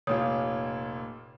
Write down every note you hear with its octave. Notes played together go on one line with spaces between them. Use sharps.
F1 A#2 F4 C#5 D#6